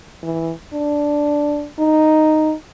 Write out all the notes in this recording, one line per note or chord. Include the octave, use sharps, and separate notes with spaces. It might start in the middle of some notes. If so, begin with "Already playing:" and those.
E3
D4
D#4